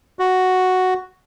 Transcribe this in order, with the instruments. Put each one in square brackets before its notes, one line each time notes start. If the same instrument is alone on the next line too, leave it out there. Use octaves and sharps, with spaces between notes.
[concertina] F#4